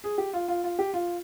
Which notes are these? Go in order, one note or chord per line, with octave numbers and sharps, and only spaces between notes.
G#4
G4
F4
F4
F4
G4
F4